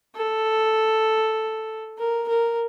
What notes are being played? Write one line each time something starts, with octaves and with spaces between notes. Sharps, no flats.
A4
A#4
A#4